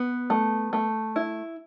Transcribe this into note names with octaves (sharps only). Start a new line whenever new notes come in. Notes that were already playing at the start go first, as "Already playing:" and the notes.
Already playing: B3
A3
A3
E4